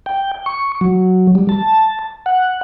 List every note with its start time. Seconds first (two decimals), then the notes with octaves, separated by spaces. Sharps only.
0.06 G5
0.46 C#6
0.81 F#3
1.35 G3
1.49 A5
2.26 F#5